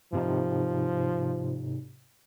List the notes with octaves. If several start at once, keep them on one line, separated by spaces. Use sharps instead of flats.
G#2 C3 F3 D#4